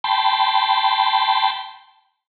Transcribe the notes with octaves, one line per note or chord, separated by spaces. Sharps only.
G5 A5 B5 C6